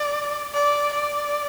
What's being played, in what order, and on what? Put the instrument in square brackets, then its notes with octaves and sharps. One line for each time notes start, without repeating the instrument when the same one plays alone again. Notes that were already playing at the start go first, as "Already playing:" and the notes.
Already playing: [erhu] D5
D5
D5